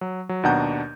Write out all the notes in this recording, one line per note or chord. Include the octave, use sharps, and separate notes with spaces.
F#3
F#3
D#2 B2 D4 F#5 A#5 G6